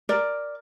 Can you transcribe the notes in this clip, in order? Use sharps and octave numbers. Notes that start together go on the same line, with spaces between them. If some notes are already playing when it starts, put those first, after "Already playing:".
A#4 D5